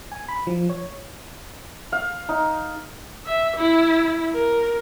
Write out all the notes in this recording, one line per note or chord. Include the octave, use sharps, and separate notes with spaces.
G#5
B5
F3
C#5
F5
D#4
E5
E4
A#4